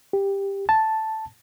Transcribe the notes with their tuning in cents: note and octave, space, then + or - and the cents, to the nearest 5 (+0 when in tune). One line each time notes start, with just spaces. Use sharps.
G4 +10
A5 +0